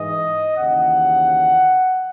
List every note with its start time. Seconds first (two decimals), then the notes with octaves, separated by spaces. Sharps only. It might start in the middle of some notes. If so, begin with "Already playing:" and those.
Already playing: G#2 E3 D#5
0.57 D#2 C#3 E3 F#5